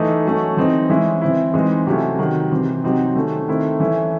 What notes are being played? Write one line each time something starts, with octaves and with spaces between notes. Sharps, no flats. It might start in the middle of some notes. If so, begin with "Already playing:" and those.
Already playing: E3 A3 D#4
F#3 A3 C#4
E3 C4 D#4
E3 G#3 C#4 E4
E3 C4 E4
E3 G#3 C4 D#4
C3 F#3 A3 C#4 E4
C3 D#3 F#3
C3 E3 C4
C3 F#3 C4 D#4
D#3 A3 C#4
D#3 A3 C4 E4
E3 A3 C#4 E4